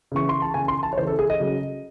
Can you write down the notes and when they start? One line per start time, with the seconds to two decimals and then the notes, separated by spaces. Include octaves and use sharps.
0.12 C#3 E3 C#6
0.29 C6
0.42 A5
0.54 C#3 E3 G#5
0.68 C6
0.83 A5
0.93 C#5
0.98 C#3 E3 C5
1.07 A4
1.19 G#4
1.30 D#5
1.40 C#3 F#3